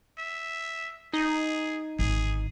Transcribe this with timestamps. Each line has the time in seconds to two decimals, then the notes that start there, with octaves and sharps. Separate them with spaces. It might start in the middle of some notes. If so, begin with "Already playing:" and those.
0.18 E5
1.13 D#4 G#4
1.99 G#1 D3 G#4